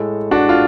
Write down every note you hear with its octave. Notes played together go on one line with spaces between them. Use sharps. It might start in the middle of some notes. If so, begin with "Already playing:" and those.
Already playing: A2 G#3 A4
D4 F#4
F4